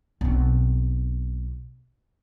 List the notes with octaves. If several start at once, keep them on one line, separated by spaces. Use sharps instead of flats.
B1 C4